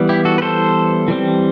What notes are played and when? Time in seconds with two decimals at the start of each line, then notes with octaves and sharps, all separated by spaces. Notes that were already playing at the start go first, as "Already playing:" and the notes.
Already playing: E3 G3 B3
0.09 E4 G4
0.25 F#4 A4
0.38 B4
0.42 A4 C5
1.08 E3 G3 C4